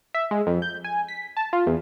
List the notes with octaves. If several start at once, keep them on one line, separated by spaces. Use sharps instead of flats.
E5
G#3
F2
G6
G#5
B6
A5
F4
E2